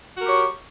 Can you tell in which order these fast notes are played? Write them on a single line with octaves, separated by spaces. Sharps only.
F#4 A#4 G4 C#5